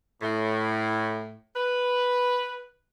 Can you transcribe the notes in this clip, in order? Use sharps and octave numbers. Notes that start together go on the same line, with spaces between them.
A2
B4